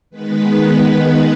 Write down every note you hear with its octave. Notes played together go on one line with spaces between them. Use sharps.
D#3 G#3 B3 B4